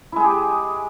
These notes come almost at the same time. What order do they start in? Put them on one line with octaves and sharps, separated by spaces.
E4 G#3 G#4 G4